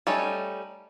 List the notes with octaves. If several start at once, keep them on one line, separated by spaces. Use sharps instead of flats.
G3 A3 C#4 D#4 A4